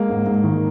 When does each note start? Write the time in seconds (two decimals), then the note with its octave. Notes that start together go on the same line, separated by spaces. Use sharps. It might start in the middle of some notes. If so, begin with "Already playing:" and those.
Already playing: G#3 A#3
0.10 G#2
0.26 G#2
0.44 D#3